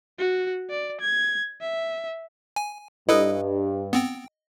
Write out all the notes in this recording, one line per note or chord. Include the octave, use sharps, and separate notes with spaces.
F#4
D5
G#6
E5
G#5
G2 E4 A4 B4 D#5
B3 C4 G5